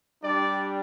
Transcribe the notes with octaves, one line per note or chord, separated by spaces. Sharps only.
G3 D4 G4 D5